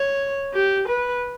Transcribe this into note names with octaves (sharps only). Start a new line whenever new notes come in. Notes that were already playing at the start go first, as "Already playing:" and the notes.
Already playing: C#5
G4
B4